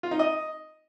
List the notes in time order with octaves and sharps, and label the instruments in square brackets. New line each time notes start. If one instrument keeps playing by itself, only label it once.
[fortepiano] F4
D#4
D#5